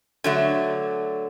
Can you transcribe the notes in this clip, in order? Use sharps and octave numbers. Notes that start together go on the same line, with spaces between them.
D3 F#3 A3